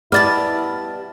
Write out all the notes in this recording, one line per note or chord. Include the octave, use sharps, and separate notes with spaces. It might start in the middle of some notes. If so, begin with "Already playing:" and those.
B2 G3 B3 E4 D5 A5 F6 A6